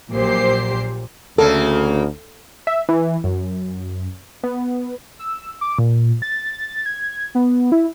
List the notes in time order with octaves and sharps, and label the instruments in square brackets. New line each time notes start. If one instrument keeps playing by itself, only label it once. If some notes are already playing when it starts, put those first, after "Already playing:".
[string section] A#1 A#2 F#3 G4 C5 C7
[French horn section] D2 [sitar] C#3 A#3 [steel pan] A4
[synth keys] E5
E3
F#2
B3
[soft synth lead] E6
D6
A#2
A6
G#6
B3
E4